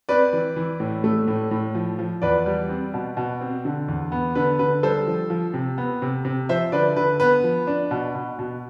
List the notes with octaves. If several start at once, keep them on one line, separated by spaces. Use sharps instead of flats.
C4 B4 D5
E3
E3
A2
A3
A2
A2
F3
F3
E2 B4 D5
G3
C4
B2
B2
C4
D3
E2
B3
D3 B4
D3 B4
G3 A4 C5
F3
F3
C3
B3
C3
C3
F3 C5 E5
D3 B4 D5
D3 B4
B3 B4
F3
D4
B2
B2
B2